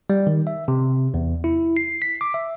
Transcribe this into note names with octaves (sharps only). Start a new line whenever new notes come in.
G3
D#3
E5
C3
E2
E4
C7
B6
D6
E5